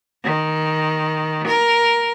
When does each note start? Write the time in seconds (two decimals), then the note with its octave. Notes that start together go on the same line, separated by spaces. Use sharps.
0.24 D#3
1.48 A#4